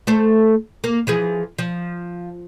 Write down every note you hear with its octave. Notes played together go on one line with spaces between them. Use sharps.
A3 A4 C5
A#3
E3 F3 G#4
F3